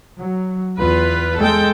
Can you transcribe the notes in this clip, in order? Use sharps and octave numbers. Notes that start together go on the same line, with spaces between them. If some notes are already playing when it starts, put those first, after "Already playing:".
F#3
E2 F4 B4
G#3 A4 G5